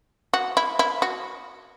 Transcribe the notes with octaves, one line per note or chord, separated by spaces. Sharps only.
F#4
E4
E4
F#4